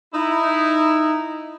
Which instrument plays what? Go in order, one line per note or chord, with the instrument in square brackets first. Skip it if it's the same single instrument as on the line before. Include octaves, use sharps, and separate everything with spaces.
[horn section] D#4 E4